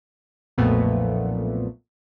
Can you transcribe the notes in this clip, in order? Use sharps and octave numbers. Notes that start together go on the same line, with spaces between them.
B1 F2 A#2 A3 B3